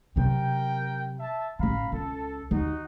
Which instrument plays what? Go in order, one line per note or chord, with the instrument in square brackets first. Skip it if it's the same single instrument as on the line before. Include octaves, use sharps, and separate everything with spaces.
[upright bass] C3 F#3 [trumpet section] A#4 G5
[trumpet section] E5 A5
[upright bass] A1 C#3 [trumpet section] F5 A#5 B5
[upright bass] C#2 [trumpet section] A4
[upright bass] D#2 [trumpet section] D#4 F#4 F#5